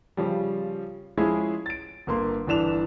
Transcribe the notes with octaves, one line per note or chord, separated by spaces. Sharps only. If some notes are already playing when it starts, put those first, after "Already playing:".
C#3 F3 G3
F3 G#3 C#4 E4 G#4
A6 D7
G1 A#3 C6
G1 E3 D4 E7 F7